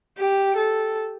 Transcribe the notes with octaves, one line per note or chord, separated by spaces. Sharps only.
G4
A4